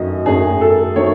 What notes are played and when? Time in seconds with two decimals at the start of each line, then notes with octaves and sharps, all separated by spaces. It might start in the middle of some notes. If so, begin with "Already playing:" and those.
Already playing: F#2 D#3 F#3 A3 D#5
0.26 F#2 D#3 F#3 A3 G#4
0.61 A4
0.96 D#3 F#3 A3 C#5